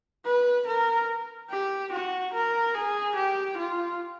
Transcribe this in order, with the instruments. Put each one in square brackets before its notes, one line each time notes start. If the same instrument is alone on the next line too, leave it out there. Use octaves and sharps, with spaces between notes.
[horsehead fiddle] B4
A#4
G4
F#4
A#4
G#4
G4
F4